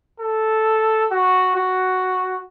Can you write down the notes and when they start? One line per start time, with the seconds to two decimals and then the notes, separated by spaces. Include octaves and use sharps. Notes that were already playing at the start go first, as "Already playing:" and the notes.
0.20 A4
1.11 F#4
1.56 F#4